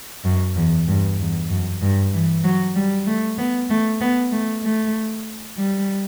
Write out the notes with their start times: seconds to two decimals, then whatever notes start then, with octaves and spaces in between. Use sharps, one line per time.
0.25 F#2
0.56 E2
0.88 G2
1.19 E2
1.50 F#2
1.82 G2
2.13 E3
2.44 F#3
2.76 G3
3.06 A3
3.38 B3
3.70 A3
4.01 B3
4.32 A3
4.63 A3
5.57 G3